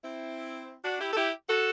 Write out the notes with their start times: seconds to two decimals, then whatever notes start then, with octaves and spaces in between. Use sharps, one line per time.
0.03 C4 E4
0.85 D4 F#4
1.01 E4 G4
1.12 A4
1.17 E4 G4
1.49 F#4 A4